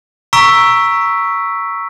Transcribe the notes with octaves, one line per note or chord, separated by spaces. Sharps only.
A#5 C#6 E6 B6 D7